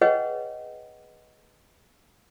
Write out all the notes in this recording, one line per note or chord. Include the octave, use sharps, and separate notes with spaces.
G#4 B4 C#5 D#5 F#5 G5